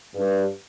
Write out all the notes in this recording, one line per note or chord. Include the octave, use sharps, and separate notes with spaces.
G2